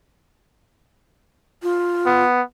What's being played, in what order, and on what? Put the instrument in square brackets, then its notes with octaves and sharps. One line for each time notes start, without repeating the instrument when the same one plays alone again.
[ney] F4
[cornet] B3